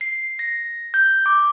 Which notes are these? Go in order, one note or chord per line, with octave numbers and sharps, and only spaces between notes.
C7
A#6
G6
D6